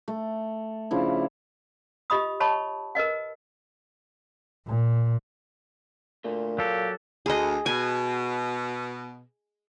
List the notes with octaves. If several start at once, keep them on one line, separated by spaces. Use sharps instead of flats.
A3
C#3 F3 D4 E4
F4 G4 D#5 B5 D#6
C#5 D#5 A5 B5 C#6
A#4 B4 D#5 F#5
A#2
A#2 D3 A3 A4
F#3 G4 A4 F5
D2 G#4 D#5
B2 G#5